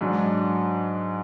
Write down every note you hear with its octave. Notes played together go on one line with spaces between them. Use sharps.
G#2 F#3 D4